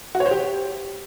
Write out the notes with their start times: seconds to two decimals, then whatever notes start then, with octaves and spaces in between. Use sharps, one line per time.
0.15 F#4
0.20 C#5
0.26 C5
0.31 G4